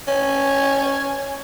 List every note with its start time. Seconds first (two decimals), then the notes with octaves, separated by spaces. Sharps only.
0.07 C#4